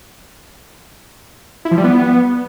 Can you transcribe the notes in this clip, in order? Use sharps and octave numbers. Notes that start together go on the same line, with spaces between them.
E4
F3
G3
B3